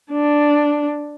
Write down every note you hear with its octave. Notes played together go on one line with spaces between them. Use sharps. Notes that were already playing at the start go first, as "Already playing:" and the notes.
D4